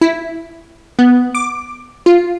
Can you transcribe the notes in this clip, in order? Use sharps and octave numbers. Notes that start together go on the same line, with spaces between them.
E4
B3
D6
F4